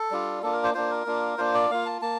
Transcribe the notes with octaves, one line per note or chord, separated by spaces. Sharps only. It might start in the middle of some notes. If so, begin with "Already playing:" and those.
Already playing: A4
G3 D4 F4
A#3 D4 F4 A4
A#4
C5
A#3 D4 F4 C5
A#4
A#3 D4 F4
A#3 D4 F4 C5
D5
A#3 F4 F5
A5
A#3 A5